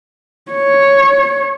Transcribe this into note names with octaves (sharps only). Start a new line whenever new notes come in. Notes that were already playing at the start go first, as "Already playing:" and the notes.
C#5